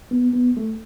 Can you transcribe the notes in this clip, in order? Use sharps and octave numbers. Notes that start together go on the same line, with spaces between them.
B3
B3
A3